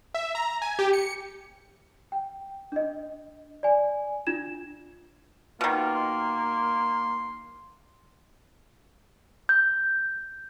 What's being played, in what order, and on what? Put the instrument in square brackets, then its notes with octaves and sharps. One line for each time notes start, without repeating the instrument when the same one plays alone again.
[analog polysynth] E5
A#5
G#5
G4
C#7
[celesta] G5
D4 D#5
D5 G#5
D4 F4 G#6 E7
[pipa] B2 D#3 [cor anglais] A#3 [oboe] F4
[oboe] C6
[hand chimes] G6